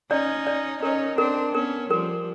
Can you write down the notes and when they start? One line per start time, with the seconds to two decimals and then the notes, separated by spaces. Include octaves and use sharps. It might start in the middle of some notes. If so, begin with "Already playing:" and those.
0.10 C#4 D#4 D5
0.47 D5
0.83 C#4 D#4 A#4
1.18 C4 D4 A#4
1.54 B3 C#4 A#4
1.90 F3 G3 A#4